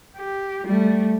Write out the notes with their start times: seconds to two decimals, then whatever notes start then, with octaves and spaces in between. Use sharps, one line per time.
0.17 G4
0.65 G3 A3